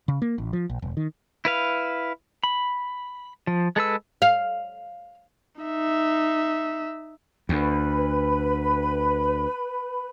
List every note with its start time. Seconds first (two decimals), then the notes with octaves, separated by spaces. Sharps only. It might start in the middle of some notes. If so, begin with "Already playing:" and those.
0.08 C#3
0.22 A#3
0.38 A1
0.53 F3
0.70 A#1
0.82 E1
0.97 D#3
1.45 E4 B4 F5
2.44 B5
3.47 F3
3.76 G#3 A4 B4 E6
4.22 F5
5.61 D#4 E5
7.49 D2 B4 B5